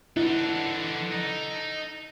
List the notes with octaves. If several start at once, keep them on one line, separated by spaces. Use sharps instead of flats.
E3 D#4 E4 A4 F#5
D#4